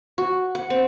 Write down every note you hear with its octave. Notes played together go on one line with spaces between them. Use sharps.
F#4
F#5
C4